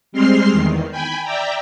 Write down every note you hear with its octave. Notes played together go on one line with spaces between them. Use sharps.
G3 G#3 C4 C6 F6 C7
E2 D#3
G5 G#5 B5
D5 E5 G5 A#5